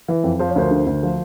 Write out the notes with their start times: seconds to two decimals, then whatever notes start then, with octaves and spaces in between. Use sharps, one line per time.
0.08 E3
0.24 F2
0.39 F3 C5
0.49 C#5
0.56 D2 A#4 C5
0.71 D3
0.87 D2
1.03 F3